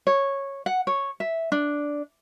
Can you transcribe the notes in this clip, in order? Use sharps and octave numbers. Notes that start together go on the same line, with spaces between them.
C#5
F#5
C#5
E5
D4